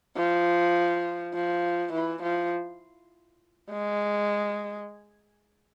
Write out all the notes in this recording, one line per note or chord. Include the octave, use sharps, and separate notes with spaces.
F3
F3
E3
F3
G#3